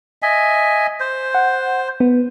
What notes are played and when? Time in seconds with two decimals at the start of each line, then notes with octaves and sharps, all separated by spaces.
0.22 D#5 E5 G#5
1.00 C5
1.35 F#5
2.00 B3